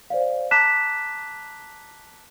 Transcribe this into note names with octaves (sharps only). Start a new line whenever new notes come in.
C5 D5 F5
A5 A#5 D6 F#6 B6 E7